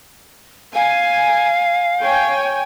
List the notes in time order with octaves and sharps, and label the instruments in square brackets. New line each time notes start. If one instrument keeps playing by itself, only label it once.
[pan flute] F5 [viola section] G#5
[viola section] C#5 G5 G#5